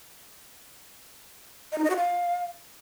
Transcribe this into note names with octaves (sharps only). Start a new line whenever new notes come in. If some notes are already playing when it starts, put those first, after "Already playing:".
D#5
D#4
D#5
F#4
F5